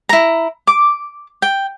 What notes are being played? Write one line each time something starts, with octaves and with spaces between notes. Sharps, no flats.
E4 A#5
D6
G5